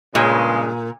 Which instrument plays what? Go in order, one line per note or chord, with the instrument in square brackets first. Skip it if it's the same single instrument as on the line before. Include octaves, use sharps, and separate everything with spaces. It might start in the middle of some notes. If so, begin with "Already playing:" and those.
[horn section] G2 C#3 G#3 [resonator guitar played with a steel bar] A#2